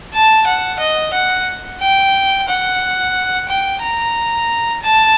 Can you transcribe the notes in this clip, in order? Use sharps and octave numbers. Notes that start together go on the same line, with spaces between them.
A5
F#5
D#5
F#5
G5
F#5
G5
A#5
A5